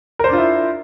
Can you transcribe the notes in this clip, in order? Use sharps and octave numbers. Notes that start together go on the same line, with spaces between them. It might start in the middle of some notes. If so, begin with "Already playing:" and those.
D4 E4 F4 A#4 C5